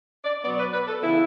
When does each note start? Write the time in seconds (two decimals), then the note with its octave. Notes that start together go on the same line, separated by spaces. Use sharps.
0.25 D5
0.44 B2 F#3 B3 D5
0.58 B4
0.73 B4
0.87 A4
1.02 C#3 E3 B3 E4